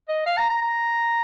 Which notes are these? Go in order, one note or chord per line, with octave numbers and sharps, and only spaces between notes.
D#5
F5
A#5
A#5
A#5